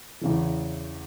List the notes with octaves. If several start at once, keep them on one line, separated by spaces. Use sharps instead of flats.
E2 C#3 E3